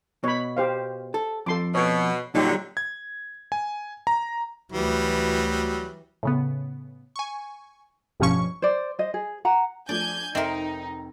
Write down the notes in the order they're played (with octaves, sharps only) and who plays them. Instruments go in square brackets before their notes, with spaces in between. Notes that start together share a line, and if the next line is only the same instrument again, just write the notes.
[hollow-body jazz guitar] B2 [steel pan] C#5 B5
[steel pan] G4 C5 F5
[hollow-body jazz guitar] A4
[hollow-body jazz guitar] F2 [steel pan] A4 C6 D6
[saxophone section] B2 [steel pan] C#5
[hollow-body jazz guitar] A#2 G3 [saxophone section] D3 F#3 [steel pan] D#4 G4
[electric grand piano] G#6
G#5
A#5
[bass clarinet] D2 [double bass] E3 [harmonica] F#3 G3
[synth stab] A2 C#3 B3
G#5 C#6
A1 G2 B2 F3 C#4 C#6
[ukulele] C5 D5
C5 D#5
G#4
F#5 A#5
[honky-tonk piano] F3 A3 D4 [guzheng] D5 [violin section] G#5 G6 G#6
[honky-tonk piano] F1 [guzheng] C4 A#4 [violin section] D#4 [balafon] D#5 E5